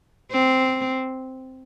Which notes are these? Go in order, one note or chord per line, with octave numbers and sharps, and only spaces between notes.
C4